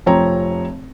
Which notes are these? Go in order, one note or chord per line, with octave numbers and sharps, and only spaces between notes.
F1 F3 C4 C#5 A#5